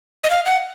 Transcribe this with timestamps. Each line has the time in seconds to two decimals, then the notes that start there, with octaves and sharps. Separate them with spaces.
0.24 D#5
0.30 F5
0.45 F#5